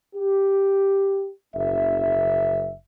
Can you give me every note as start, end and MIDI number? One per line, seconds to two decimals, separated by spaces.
0.16 1.29 67
1.55 2.73 30
1.55 2.73 76